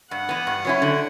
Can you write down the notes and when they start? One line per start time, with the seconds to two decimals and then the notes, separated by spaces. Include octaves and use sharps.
0.11 G2 F#5
0.29 E3 B3
0.47 G2
0.65 F#3 C#4 E4
0.82 D3